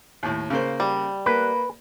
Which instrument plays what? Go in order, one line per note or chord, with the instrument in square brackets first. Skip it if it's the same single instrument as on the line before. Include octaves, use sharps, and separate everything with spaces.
[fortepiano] D#2 A2
C#3 A#3 C5
[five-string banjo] G3
[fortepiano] A#3 [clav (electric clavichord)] B4